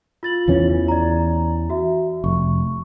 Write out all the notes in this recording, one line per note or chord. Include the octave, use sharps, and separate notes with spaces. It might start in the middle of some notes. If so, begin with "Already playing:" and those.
F4 A6 F#7
E2 E3 C#4
D5 A#5
F#4 E5
F1 C#6